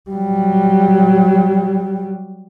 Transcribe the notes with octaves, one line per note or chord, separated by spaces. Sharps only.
F#3 G3